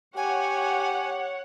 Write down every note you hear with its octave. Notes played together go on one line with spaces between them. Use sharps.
G4 C#5 F#5 G#5